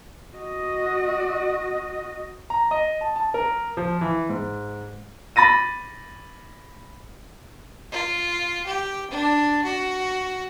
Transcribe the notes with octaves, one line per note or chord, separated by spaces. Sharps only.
F#4 D#5
A#5
D#5
A5
A5
A#4
F3
E3
G#2
B5 A6 A#6 D#7
F4
G4
D4
F#4